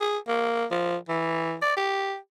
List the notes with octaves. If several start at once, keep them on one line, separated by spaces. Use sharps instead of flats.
G#4
A#3
F3
E3
D5
G4